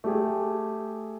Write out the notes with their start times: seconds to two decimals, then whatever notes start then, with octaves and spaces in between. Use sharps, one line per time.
0.04 A3 G4 G#4